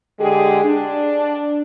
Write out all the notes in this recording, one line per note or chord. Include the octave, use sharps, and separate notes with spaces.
D3 G#3 G4 G#4
D4